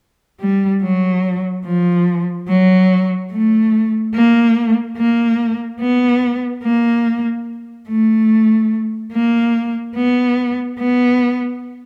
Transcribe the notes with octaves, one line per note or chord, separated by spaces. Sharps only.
G3
F#3
F3
F#3
A3
A#3
A#3
B3
A#3
A3
A#3
B3
B3